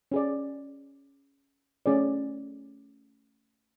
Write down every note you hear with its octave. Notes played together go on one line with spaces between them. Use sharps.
C#4 G#4 D5
A3 C#4 G#4 D5